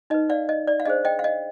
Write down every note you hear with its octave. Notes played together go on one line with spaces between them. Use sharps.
D#4 B4 D#5
D5 F5
D#5
D5
F5
D4 G#4 C5 D#5
D#5 G5
F5
D#5